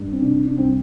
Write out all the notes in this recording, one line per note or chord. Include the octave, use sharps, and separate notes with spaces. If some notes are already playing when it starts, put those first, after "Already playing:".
Already playing: G2
C4
C3 D4
D4
C2 C4